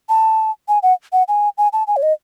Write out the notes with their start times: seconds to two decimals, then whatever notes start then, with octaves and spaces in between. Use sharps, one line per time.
0.09 A5
0.68 G#5
0.83 F#5
1.12 F#5
1.28 G#5
1.58 G#5
1.73 A5
1.87 G#5
1.96 C#5
2.02 D#5